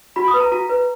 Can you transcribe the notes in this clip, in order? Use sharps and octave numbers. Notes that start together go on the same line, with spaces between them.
F#4 B5
D#6
B4
A#5
F#4 A#5
B4